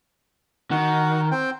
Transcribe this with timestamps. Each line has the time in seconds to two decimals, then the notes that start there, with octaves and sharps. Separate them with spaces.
0.71 D#3 F#4 F#5
1.31 C4 G5